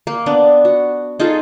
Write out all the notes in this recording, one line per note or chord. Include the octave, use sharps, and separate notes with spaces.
A#3
B3 D4
F#4
D#4 F4 G#4 A4